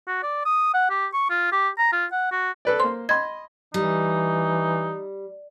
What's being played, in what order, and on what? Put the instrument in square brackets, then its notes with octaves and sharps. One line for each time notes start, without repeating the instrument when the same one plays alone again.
[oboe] F#4
D5
D#6
F#5
G4
C#6
F4
G4
A#5
F4
F#5
F#4
[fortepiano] A4 B4 D5
[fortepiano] A#3 C5 [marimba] C6
[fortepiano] D#5 B5 C6 [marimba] G#6
[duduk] E3 [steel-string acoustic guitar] G3 [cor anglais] D#4